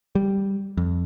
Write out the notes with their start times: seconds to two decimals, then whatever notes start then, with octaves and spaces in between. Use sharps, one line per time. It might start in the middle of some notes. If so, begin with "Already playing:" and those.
0.15 G3
0.78 F2